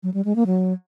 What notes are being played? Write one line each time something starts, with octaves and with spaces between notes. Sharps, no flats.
F#3
G3
G#3
A#3
F#3